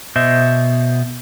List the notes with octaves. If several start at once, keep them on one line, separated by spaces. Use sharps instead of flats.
B2 C5 D#5 E5